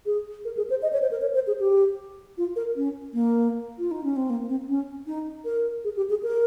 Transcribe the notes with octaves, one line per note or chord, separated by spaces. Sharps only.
G#4
A#4
G#4
C5
D#5
C#5
C5
A#4
C#5
C5
G#4
G4
F4
A#4
C#4
A#3
F4
D#4
C#4
C4
A#3
C4
C#4
D#4
A#4
G#4
G4
G#4
A#4